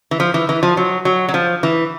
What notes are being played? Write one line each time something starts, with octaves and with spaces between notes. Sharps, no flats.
E3
F3
E3
E3
F3
F#3
F#3
F#3
F3
E3